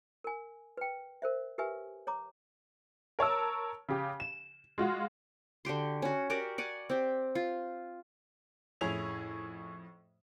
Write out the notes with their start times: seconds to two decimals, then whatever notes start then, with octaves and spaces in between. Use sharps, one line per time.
0.24 A#4 G#5
0.77 B4 G5
1.22 A#4 C5 E5
1.58 G4 A#4 B4 E5 G#5
2.07 C#5 A#5 D6
3.19 A#4 C#5 A5 E6
3.89 C#3 G4
4.20 E7
4.78 G#3 F4 F#4
5.65 D3 F#4 G4 C6
6.02 C#4 F#4
6.30 F#4 G4 A#4 D5
6.58 D5 F#5 G#5
6.90 C4 G4
7.35 F4
8.81 F2 A2 C#4 E4 G#4 F7